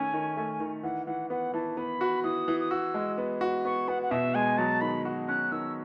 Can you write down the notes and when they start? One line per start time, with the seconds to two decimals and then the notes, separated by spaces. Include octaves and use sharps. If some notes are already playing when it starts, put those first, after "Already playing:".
Already playing: D#3 A3 C#4 G#5
0.13 D#3
0.37 A3
0.60 D#3
0.84 E3 F#5
1.07 E3 F#5
1.30 B3 F#5
1.54 E3 A5
1.77 B3 B5
2.01 F#4
2.24 E3 D#6
2.48 E3
2.60 D#6
2.71 F#4 E6
2.94 G#3
3.18 B3
3.41 F#4
3.65 B3 C#6
3.88 B3 F#5
4.03 F#5
4.11 B2 E5
4.35 G#3 G#5
4.58 F#3 A5
4.81 D#3 B5
5.05 F#4
5.28 C#4 F#6
5.52 D#3 E6